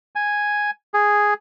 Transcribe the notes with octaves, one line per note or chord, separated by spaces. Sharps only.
G#5
G#4